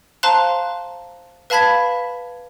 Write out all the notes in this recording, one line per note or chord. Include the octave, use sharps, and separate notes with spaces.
C5 F5 A5 A#5 C6 F#6
B4 F5 A5 B5 G#6 B6